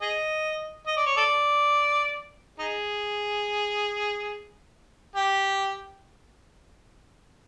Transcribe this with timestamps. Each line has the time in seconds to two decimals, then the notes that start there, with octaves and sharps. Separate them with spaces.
0.01 G#4 D#5
0.87 D#5
0.97 D5
1.06 C#5
1.17 A4 D5
2.59 D#4 G#4
5.16 G4